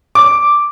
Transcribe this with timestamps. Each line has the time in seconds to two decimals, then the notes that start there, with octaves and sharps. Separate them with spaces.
0.15 D6